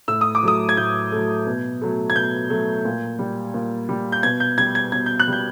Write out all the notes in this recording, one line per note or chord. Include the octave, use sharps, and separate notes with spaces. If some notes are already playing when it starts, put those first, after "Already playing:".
A2 E6
D#6
D6
F#3 A3 D#6
G#6
A2 G6
F#3 A3
B2
F#3 A3
G#6
B2 G6
F#3 A3
A#2
G3
A#2
G3
G6
B2 G#6
G6
G3 G#6
G#6
B2 G#6
G6
F#6
G3 G6